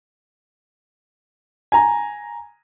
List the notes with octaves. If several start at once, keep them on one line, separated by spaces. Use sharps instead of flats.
G#5 A#5